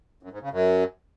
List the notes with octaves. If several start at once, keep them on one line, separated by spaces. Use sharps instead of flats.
F#2
G#2
C#3
F#2